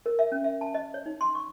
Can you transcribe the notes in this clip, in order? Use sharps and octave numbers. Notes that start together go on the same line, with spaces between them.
A#4
E5
C#4
E5
A5
D#5
C#5
D#4
C6
C#6